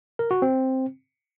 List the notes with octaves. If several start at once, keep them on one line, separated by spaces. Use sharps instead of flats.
A#4
F#4
C4